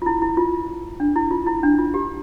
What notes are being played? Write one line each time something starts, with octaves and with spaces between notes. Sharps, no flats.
F4
E4
E4
F4
D4
E4
F4
E4
D4
F4
G4